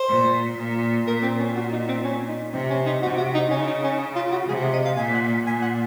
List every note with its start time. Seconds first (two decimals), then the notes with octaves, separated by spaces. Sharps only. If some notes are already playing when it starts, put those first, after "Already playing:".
Already playing: C5
0.09 A#2
0.58 A#2
1.07 A#2 A#4
1.22 C4
1.39 C#4
1.56 F#4
1.72 D#4
1.88 C4
2.05 C#4
2.28 D#4
2.53 C3 C4
2.70 C#4
2.86 D#4
3.01 C3 F#4
3.18 F#4
3.34 D#4
3.50 C#3 C#4
3.67 D#4
3.84 C#4
4.16 F4
4.32 F#4
4.48 C3 G#4
4.73 D#5
4.85 F5
4.97 A#2 G#5
5.14 F#5
5.46 A#2 G#5
5.62 F#5